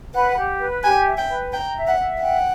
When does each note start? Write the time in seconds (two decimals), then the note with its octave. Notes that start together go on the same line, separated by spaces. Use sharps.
0.14 B4 F#5
0.37 G4
0.60 B4
0.83 G4 G#5
1.06 E5
1.17 G5
1.29 B4
1.52 G5 A#5
1.75 E5
1.87 F#5
1.99 E5
2.21 F#5 G5